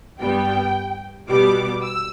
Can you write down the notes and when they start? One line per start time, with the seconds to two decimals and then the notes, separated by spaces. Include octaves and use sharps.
0.19 G2 G3 B3 G5
1.29 B2 G3 B3 D6
1.83 E6